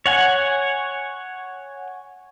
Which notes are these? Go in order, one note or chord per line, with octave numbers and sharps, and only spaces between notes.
C#5 F#5 G#5